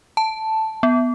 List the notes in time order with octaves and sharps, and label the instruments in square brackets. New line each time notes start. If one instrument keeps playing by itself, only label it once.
[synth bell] A5
B3